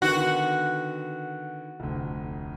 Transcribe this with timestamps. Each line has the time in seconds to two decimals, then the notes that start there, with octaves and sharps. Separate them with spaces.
0.02 D3 D#3 B3 F#4
1.80 F1 D2